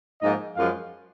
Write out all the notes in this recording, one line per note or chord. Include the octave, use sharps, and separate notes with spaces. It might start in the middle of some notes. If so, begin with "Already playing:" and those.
G#2 F3 A#3 D#4 D#5
F#2 F3 G#3 F4 F5